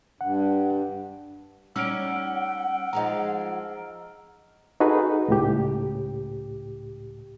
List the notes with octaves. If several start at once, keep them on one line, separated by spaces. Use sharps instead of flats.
G2 F#5
G3 C#4 D#4 F#5 E6 F6 D7
F3 G#3 D#4 D#5 A#5
D#4 F#4 G#4 A4 B4
C#2 A2 G4